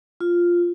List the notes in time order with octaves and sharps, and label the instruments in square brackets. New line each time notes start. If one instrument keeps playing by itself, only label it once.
[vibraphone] F4